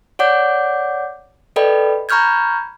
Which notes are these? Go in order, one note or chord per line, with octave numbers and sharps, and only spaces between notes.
C#5 D5 F#5 D6 G6
A4 B4 D5 D#5 G5 B5
A#5 B5 C#6 F6 G6 G#6